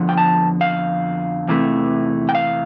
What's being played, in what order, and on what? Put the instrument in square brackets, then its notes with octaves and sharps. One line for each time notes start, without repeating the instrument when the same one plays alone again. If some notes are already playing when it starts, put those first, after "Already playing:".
Already playing: [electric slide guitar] F2 D3 F3 B3
G5
A5
F5
E2 C3 E3 A3
G5
F5